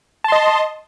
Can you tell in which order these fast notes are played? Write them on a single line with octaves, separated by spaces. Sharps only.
A5 C6 D#5